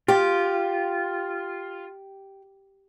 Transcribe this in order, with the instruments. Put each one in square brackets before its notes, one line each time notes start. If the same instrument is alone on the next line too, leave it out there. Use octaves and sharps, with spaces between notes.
[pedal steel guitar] F4 [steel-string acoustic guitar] G4